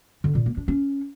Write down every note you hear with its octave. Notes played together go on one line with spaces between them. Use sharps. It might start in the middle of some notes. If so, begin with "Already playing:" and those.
D3
A#2
A#3
D4
C#4